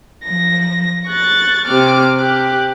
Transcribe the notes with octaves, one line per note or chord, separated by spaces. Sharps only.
F3 A#6
C#6 F#6 A6
C3 D6 F6
G4 F#6